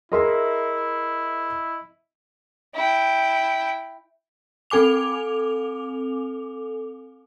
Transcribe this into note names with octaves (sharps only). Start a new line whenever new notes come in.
E4 G#4 A#4 D#5 E5 C6
E4 G5
C4 A4 G#5 D6 F7